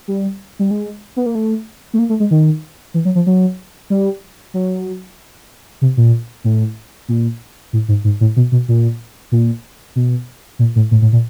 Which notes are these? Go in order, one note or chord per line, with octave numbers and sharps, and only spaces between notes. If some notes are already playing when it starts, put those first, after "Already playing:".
G3
G3
G#3
B3
A#3
A3
A3
A#3
A3
G#3
D#3
E3
F#3
F3
F#3
G3
F#3
C3
A#2
A2
A#2
A2
G#2
G#2
A2
B2
B2
A#2
A#2
B2
A#2
A2
A2
A2
A#2